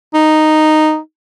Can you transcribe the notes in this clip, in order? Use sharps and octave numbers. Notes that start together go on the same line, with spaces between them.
D#4